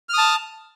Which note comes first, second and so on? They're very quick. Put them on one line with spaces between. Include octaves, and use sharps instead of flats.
F6 D#6 A5